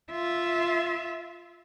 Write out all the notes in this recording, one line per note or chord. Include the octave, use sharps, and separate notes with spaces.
F4 E5